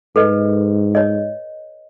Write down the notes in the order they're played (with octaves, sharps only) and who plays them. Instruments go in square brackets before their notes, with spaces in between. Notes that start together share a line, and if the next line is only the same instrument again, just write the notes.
[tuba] G#2 [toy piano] A4 B4 D#5
[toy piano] C#5 D#5